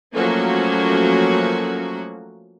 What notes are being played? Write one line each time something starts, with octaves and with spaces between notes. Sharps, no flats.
F3 F#3 A3 A#3 C#4 F#4